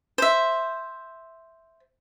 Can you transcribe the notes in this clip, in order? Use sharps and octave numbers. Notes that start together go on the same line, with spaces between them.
C5 E5